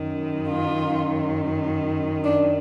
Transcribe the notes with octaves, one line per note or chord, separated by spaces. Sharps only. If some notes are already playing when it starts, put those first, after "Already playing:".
Already playing: F#2 D#3
F4
D4